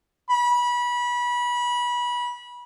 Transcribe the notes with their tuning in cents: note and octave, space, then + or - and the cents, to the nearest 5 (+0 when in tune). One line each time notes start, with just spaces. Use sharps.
B5 -25